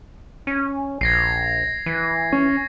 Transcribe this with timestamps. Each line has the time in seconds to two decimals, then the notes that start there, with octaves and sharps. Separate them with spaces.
0.47 C#4
1.01 A#1 G#6 A#6 C7
1.86 E3
2.33 C#4 C#6